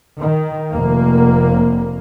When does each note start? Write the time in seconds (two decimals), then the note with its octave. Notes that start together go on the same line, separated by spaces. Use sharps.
0.19 D#3
0.73 F1 A#3